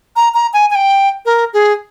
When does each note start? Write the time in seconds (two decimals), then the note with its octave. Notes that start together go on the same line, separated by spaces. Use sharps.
0.16 A#5
0.34 A#5
0.53 G#5
0.71 G#5
0.75 G5
1.26 A#4
1.53 G#4